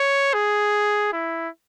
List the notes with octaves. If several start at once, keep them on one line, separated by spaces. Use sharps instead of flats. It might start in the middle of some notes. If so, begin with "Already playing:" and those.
Already playing: C#5
G#4
E4